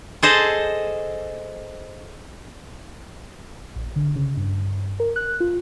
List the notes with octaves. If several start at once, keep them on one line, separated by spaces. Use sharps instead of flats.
G#4 A4 C5 D#5 A5
A#1
D3
C#3
G2
A#4
F#6
F4